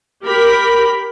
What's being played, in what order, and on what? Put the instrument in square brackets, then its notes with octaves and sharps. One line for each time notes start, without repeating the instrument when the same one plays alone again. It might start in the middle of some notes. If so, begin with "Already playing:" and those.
[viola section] G4 A#4 B5